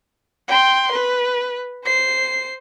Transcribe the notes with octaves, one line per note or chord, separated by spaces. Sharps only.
G5 C6
B4
C5 C7